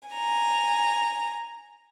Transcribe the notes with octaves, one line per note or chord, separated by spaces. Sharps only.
G#5 A#5